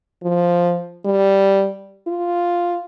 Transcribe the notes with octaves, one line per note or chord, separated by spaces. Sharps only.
F3
G3
F4